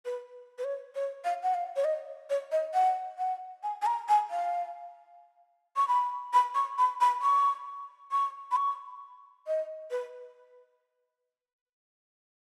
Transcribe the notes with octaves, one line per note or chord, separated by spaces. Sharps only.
B4
B4
C#5
C#5
F5
F#5
F5
C#5
D#5
C#5
D#5
F#5
F#5
G#5
G#5
A#5
G#5
F5
C#6
B5
B5
C#6
B5
B5
C#6
C#6
B5
C#6
D#5
B4